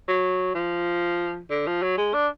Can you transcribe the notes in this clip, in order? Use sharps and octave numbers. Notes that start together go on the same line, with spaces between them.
F#3
F3
D3
F3
F#3
G#3
D4